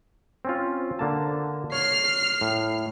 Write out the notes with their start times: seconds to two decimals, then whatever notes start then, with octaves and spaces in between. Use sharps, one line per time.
0.45 C4 C#4 F4
0.99 D3 A#3 A5
1.72 C#5 F6 C7
2.41 A2